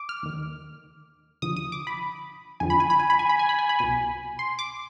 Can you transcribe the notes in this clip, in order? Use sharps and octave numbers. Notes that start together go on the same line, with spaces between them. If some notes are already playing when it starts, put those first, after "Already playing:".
Already playing: D6
F6
D#2 D#3
D#2 D3 F3 D#6
D#6
D6
B5
F2 D3 F3 G#5
B5
G#5
B5
G#5
B5
G#5
B5
G#5
B5
G#5
B5
C2 B2 G#5
C6
D6